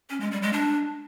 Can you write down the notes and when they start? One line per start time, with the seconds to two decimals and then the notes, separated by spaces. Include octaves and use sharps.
0.10 C#4
0.21 G#3
0.31 G3
0.42 G#3
0.53 D4